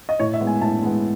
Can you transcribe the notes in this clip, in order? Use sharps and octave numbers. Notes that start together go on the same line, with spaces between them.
D#5
A2 C#5
E5
G#3 B3
G#5
A2 A5
G#3 B3